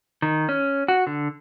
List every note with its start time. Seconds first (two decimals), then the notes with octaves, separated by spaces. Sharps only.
0.22 D#3
0.49 C#4
0.88 F#4
1.07 D3